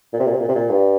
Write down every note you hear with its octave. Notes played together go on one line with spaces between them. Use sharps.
A#2
C3
A#2
C3
A#2
C3
A#2
G2